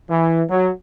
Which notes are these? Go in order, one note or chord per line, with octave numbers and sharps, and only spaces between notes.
E3
F#3